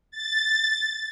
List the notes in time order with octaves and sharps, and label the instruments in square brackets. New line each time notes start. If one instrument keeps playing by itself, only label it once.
[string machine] A6